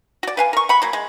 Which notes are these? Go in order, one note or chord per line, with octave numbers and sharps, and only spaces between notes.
F#4 D5
B4 F5 G#5
A#4 C#6
F#5 B5
F#3 A#3
G#3